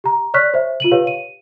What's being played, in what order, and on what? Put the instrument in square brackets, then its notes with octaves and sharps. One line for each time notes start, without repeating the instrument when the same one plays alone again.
[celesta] G4 A#5
C#5 D5 C#6 F6 F#6 B6
C5 E5
F4 D#7 F#7
G4 B4 C#5 F5
D#7